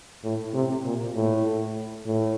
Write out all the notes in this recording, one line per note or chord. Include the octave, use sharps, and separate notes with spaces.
A2
C3
A#2
A2
A2